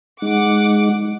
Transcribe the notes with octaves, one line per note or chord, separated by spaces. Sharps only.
G#3 D#4 F#5 D6